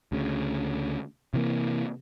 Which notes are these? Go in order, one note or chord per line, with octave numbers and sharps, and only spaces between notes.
D2 C#3
C3 E3 A#3